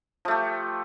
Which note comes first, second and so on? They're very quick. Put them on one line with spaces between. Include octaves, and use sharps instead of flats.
F3 A3 G4